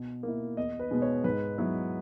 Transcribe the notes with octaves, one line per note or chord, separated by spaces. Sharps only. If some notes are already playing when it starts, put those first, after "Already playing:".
Already playing: B2
A#3 E4
E2 D#5
B4
B2 G#3 B3
C#5
G#2 B4
F#3 B3 E4